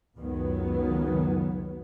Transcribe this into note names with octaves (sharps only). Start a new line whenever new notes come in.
C#2 F#2 D#3 F#3 B3